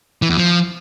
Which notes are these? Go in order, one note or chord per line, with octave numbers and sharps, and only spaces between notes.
E3
E2
F3